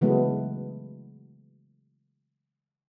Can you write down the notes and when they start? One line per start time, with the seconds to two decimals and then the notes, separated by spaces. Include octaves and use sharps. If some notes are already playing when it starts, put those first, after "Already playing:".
0.01 C#3 E3 F#3 G#3 A3 B3